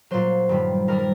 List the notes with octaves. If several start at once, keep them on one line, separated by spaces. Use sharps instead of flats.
A#2 F#3 C5
G2 D#3 G3
G2 D#3 G3 A#4
A#4